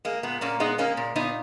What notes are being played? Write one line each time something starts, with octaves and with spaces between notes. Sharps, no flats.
G#3 A#3
A#2 B3
A#2 A#3 C#4
G#3 B3 D#4
G#3 A#3 C#4
A#2
A#2 B3 D#4